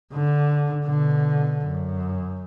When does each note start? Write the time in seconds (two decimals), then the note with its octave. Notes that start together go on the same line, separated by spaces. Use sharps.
0.13 D3
0.86 B2 D3
1.66 F#2